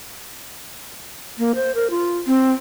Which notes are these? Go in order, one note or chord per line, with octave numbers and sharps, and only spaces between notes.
A#3
C5
A#4
F4
C4